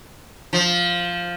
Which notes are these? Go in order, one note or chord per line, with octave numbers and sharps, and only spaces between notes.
F3